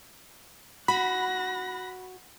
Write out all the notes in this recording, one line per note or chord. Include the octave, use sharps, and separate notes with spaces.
F#4 B5 F#6 A#6